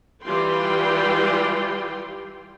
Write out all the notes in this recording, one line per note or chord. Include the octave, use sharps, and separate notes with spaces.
E3 G3 F4 G4 G5 C6